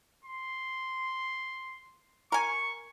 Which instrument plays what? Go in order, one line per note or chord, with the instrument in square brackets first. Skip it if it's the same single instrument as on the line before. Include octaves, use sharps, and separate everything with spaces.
[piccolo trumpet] C6
[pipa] A#4 G#5 [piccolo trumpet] C#6